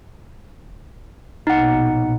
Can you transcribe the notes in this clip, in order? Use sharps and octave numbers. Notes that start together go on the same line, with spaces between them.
A#1 B2 D#4 F#5